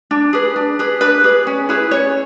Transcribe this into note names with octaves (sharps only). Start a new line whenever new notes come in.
D4
G#4 B4
D4
G#4 B4
D4 B4
G#4 B4
C#4
E4 G#4 B4
C#4 C#5